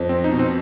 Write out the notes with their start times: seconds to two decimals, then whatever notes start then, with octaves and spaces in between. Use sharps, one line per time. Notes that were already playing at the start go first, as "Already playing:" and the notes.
Already playing: F2
0.09 C4
0.24 D#4
0.32 B2
0.39 C4